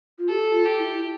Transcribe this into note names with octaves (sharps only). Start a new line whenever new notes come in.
F4
G4 A4
F4
G4
E4